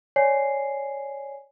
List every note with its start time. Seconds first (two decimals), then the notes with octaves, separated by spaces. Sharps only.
0.16 C#5 D5 G#5 C7